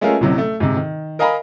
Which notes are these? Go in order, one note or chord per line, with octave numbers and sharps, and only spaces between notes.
G#3 A3 C#4 F4 G#4 A#4
A1 A2 C3 F#3
A3
G#2 C3
D#3
A#4 D#5 F5 G#5 A#5 B5